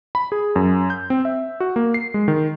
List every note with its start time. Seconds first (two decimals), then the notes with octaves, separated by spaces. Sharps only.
0.15 B5
0.32 G#4
0.56 F#2
0.90 G6
1.10 C4
1.25 E5
1.60 F#4
1.76 A#3
1.94 C7
2.14 G#3
2.28 D#3